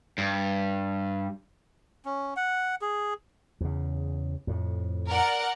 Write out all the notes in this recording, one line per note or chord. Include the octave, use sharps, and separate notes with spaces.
G2
C#4
F#5
G#4
E2 C#3
F2 A2
A#4 D5 F#5